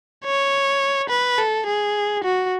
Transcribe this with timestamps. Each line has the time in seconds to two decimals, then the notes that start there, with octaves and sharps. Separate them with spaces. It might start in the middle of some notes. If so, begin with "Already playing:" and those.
0.25 C#5
1.09 B4
1.38 A4
1.67 G#4
2.24 F#4